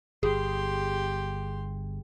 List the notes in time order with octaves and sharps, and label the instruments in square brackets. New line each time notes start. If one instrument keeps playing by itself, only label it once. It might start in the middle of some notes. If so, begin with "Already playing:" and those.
[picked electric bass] G1 [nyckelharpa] G4 C6 [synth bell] G#4